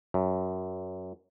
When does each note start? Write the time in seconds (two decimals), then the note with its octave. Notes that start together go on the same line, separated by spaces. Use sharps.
0.14 F#2